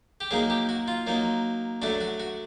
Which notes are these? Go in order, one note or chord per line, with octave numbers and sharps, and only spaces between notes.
G4
F#3 A#3 D#4 G#4
G4
F#4
F4
F#3 A#3 D#4
F#3 A3 D4 F#4
F#4
F#4